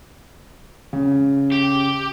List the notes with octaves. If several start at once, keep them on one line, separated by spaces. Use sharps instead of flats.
C#3
G4